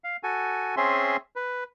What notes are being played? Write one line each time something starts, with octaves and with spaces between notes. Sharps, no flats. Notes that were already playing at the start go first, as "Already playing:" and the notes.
F5
F#4 A4 G#5
C4 C#4 G#4 E5 C6
B4